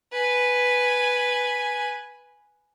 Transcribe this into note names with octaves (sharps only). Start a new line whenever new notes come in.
B4 G#5